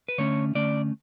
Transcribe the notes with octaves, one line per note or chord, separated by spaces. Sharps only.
B4
D3 A3 C#4 C#5
D3 A3 C#4 D5